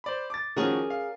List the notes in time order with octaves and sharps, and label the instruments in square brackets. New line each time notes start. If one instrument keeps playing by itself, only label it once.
[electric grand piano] C5 D5 B5
D6 A6
[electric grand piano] D#3 F3 F#4 [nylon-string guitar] C#4 G#4 A#4
[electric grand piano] F5